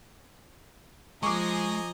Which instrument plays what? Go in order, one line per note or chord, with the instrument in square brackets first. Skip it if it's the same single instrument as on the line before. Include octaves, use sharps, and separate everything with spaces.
[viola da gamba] F3 [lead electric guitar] G#3 [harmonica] D#5 G#5 A#5 [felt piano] C#6 D6